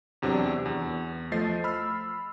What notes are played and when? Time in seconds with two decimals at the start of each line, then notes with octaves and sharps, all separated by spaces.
0.22 E2 C3 F#3 D4
0.66 E2
1.32 F3 A3 D#5 A6 C7
1.64 B5 E6 F6